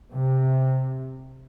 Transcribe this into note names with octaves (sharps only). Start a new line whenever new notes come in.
C3